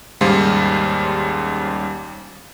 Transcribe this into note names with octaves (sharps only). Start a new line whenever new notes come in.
D#2 G#2 C#3 G3 C5 F5